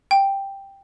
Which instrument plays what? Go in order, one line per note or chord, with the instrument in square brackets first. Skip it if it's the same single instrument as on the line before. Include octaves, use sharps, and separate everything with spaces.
[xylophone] G5